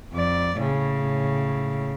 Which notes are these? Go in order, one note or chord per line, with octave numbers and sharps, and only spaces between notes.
F2 D5
A2 C#3